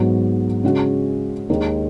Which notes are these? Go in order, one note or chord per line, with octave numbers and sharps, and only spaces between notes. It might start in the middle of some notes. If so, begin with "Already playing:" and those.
Already playing: G#2 F#3 B3 F#4
C#3 G#3 C#4 F#4
D#2 D#3 G#3